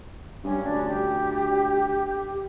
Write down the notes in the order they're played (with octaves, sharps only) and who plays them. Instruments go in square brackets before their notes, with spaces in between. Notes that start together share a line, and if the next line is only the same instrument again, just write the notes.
[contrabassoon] G2 [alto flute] C#4
[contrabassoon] D2 [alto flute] D4
[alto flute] G4